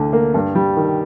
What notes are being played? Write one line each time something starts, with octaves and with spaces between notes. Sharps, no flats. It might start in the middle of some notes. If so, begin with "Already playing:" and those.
Already playing: D2 D3
A#3
G2
G3
D#3